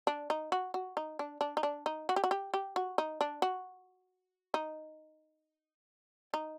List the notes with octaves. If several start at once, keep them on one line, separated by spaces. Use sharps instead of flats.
D4
D#4
F#4
F#4
D#4
D4
D4
D#4
D4
D#4
F#4
G4
F#4
G4
G4
F#4
D#4
D4
F#4
D#4
D#4